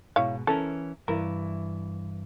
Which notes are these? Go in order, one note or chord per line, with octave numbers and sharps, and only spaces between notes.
G#2 B2 E4 C#5 F5
E3 C#4 A4 A#4
G2 E3 E4 A#4